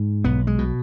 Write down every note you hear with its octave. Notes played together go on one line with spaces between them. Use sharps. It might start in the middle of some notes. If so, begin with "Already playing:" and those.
Already playing: G#2
B1 B3
G#3
B2